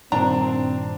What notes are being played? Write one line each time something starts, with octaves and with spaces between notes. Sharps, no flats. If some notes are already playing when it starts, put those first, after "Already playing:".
G2 A#2 D#3 C4 D4 A#5